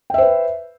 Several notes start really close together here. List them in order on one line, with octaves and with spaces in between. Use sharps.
G5 E5 C5 B4